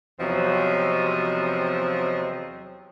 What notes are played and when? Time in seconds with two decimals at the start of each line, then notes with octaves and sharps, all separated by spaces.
0.20 E2 C3 F3 F#3 C4 D#5